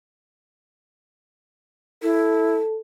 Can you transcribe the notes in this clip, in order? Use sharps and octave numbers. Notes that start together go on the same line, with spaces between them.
E4 A4